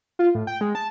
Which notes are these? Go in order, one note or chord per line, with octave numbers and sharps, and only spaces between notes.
F4
A2
G5
G#3
A5